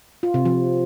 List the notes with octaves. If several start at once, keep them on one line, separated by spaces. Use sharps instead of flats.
F4
C3
F3